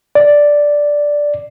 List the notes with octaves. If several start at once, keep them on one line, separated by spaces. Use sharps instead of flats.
D5